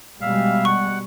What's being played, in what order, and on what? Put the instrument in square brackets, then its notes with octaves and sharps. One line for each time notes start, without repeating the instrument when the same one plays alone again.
[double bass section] B2 G3 G#3 [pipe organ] E5 F5
[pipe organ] F#5 [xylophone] C#6